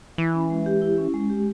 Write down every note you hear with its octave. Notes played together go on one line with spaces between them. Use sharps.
E3 E4
C#4
G#3
G4
E4
C#4
G#3
G4